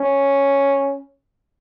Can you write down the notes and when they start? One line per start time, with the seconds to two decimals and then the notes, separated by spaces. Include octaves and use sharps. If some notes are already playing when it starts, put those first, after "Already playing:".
Already playing: C#4